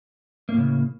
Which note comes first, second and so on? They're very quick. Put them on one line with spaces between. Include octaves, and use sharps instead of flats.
A#3 A2 C#3